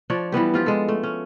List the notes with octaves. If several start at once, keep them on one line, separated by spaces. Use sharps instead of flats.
F3 D4 C#5 D5
E3 G3 B3 G4
F3 F4 G4
G#3 A4
A3
C#4